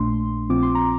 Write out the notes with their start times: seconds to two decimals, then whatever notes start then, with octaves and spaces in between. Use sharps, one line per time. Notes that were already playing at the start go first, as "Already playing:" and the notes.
Already playing: A#1 A#2 A3 D4 C6
0.50 A#1 A#2 F3 C4 F4 D6
0.63 C6
0.75 A#5